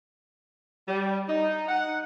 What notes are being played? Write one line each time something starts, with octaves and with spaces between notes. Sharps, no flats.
G3
D#4
F#5